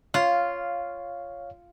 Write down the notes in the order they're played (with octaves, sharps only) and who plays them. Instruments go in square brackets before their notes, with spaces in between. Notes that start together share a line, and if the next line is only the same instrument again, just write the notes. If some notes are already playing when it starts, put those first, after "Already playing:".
[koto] F4 [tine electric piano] C#5 F5